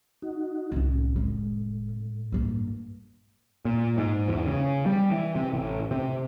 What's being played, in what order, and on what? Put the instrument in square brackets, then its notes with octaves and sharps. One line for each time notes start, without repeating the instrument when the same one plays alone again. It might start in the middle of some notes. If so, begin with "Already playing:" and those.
[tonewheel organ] D#4 F#4
[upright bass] C2 C#4 [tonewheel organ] A2
[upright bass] F1 G#3
G2 A#3
[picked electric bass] A#2
G#2
E2
C#3
G3
E3
C3
A1
C3